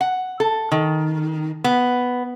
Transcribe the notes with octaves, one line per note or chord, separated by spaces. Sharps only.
F#5
A4
D#3
B3